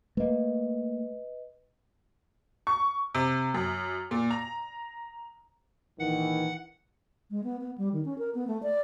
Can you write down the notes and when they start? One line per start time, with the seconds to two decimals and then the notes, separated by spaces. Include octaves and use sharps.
0.17 A3 A#3 B4 D#5
2.67 C#6
3.15 C3
3.54 F#2
4.11 A#2
4.31 A#5
5.99 A#1 D#3 E3 F#5
7.31 G#3
7.44 B3
7.61 B3
7.78 G3
7.93 D#3
8.05 C#4
8.18 A#4
8.35 B3
8.47 A3
8.63 D5